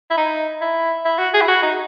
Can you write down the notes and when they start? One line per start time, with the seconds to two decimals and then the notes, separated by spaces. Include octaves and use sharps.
0.11 E4
0.18 D#4
0.61 E4
1.05 E4
1.19 F#4
1.34 G#4
1.41 E4
1.48 F#4
1.62 D#4